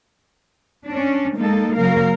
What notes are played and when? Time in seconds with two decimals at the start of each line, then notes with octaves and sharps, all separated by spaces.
0.86 C#4 D4
1.36 G#3 A#3 D#4 A4
1.75 C#3 F#3 A#3 A#4 F5